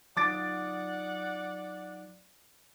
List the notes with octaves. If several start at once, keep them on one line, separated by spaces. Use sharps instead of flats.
F#3 D#4 F4 D5 F#5 D6 A6 D7